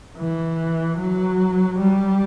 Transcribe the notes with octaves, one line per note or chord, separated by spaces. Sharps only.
E3
F#3
G3